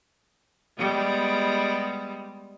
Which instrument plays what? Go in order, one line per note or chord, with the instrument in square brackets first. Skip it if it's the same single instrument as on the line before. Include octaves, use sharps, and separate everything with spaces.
[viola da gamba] G3 G#3 B3